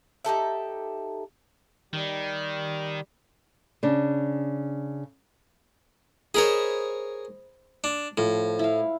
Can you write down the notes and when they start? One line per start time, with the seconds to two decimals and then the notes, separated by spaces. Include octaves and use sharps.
0.25 D#4 G4 A4 E5
1.93 D#3 G3 G4
3.83 C#3 D4
6.34 G#4 A#4 C5 C#5 D#5 B5
7.84 D4
8.18 A2 F3
8.59 E4 F5